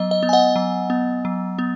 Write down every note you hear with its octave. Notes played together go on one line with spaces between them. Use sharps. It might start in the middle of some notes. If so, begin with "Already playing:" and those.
Already playing: F#3 B3 D#5
D#5
B3
G#5
D#5 F#5
F#3
B3
F#3
B3